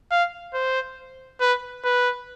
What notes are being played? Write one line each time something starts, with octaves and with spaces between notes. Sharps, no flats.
F5
C5
B4
B4